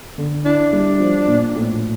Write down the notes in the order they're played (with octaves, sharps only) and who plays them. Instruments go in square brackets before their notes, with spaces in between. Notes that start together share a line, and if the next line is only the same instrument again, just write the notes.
[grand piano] D3
[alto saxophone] D4 [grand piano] E4
[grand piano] G3
F3
A#2
A2